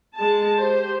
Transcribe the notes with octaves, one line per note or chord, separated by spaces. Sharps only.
G#3 A5
G4 C5